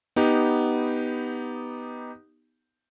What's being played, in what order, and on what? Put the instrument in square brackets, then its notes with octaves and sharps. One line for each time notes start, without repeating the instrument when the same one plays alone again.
[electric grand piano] B3 D#4 G4